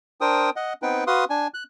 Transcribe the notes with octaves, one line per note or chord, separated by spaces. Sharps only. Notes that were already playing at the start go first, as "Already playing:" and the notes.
D4 A#4 C5 G5 D#6
D#5 F#5
B3 C4 D#4 B4 G5
F#4 B4 F5 C6 D#6
D4 G#5
F#6